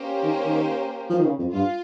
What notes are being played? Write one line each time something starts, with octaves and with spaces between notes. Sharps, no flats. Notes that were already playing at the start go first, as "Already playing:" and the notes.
Already playing: A#3 C#4 G4 C5
D#3
D#3
F3
D#3
C#3
F2
G2 F4